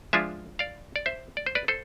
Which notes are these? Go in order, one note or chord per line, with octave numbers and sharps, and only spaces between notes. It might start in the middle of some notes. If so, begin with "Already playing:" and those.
F3 G#3 D4 F4 E5 G#5
D5 F5
D5
C5 E5
D5
C5
B4 D5
A4 C5